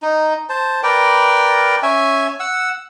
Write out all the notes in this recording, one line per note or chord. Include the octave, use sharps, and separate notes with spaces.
D#4
C5 A5
A#4 B4 D5 G5
C#4 E5 G#5
F#5 E6